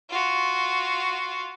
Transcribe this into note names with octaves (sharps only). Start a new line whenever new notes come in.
F4 F#4